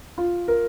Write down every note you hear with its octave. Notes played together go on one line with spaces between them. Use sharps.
F4
A#4